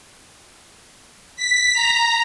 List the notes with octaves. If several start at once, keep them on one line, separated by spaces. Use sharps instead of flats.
B6
A#5